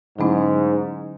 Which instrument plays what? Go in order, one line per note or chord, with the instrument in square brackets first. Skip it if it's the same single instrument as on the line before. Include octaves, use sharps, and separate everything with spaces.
[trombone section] G#2 [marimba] D3 F#3 A3 C#4 E4